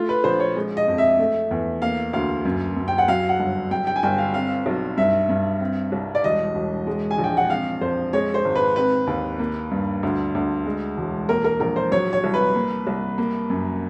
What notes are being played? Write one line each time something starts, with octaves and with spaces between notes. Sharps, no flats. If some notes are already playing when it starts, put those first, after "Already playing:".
Already playing: A3 F4
B4
A#1 C5
C#5
G#3
D#5
F2
E5
A3
E2
A#3 F5
D2 F5
F#2
F#2
G5
F#5
F#3 F5
F#5
G1
F#3 G5
G5
G#5
G1 G5
F5
C4 F5
B1
G2 E5
G2
C4
C2
D5
E1 D#5
E1
G#3
G#5
A#1
G5
F#5
C4 F5
F2 C5
G#3 C#5
C5
G#1
B4
C4 B4
D#2
A#3
G2
D2
D2
G#3
E1
A#3 A#4
A#4
A#1 A#4
C5
F#3 C#5
C#5
C2
B4
A#3
C2
A#3
F#2